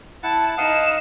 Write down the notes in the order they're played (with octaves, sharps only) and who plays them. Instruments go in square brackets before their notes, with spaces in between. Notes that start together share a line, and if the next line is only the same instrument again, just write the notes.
[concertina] E4 F#5 [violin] A5
[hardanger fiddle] D#4 [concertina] F5 F#5 D#6 [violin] E7